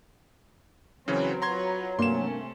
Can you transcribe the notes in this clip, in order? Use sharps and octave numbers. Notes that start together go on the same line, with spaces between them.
C#3 E3 F#3 C4 C#4 A#4 B4
F4 B4 C#5 A#5 C6 G#6
G2 C3 A3 A#3 C#4 C6 E7